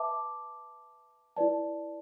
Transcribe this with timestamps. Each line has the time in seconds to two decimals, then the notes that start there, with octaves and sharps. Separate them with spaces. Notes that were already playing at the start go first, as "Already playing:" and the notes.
Already playing: B4 E5 A5 D6
1.37 E4 B4 D5 A5